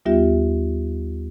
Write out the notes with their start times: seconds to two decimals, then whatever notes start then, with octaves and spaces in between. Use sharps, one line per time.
0.05 D#2 G3 B3 F4 G4 E5